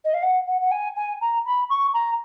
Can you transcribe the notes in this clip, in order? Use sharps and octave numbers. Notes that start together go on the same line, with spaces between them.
D#5
F5
F#5
F#5
F#5
G#5
G#5
A#5
B5
C#6
A#5